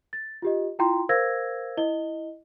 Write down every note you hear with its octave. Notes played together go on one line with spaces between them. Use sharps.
A6
F4 G4 D#5
E4 F4 G5 A#5 C6
A#4 C5 F5 E6 G#6 A#6
E4 D#5 G7